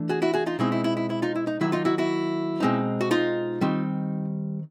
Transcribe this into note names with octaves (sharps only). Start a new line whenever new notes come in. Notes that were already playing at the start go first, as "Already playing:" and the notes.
Already playing: E3 A3 D4
F#4 G#4
E4 F#4
F#4 G#4
D#4 F4
B2 G#3 C4 D#4 E4
E4
E4
E4
E4
D#4 F4
E4
D#4
D#3 F#3 A#3 E4
D#4 F4
E4 F#4
E4 F#4
B2 G#3 C4 D#4
F#4
D#4 F4
D#3 G3 C4 D#4